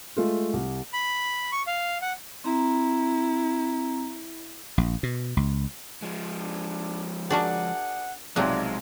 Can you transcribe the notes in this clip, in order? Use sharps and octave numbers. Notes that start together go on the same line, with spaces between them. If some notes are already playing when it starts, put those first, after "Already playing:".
G#3 A3 F4
C2
B5
C#6
F5
F#5
C4 E4 A#5
A#1
B2
C#2
F3 G#3
D4
D4 F#4 G#4 A#4 D5 F#5 A5
B1 C3 F3 F#3 G#3 C4 D5 F#6